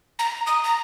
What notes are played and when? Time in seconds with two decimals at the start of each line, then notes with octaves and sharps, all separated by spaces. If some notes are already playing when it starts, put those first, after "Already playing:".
0.19 A#5
0.47 D#6
0.64 A#5